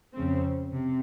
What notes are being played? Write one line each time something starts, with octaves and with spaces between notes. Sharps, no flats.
F2 C#3 F3 C4
C3